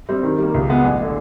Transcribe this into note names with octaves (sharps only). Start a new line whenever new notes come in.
G3 C4
D#3
G3 A#3
C#2
B2 G#3 B3
A1
D3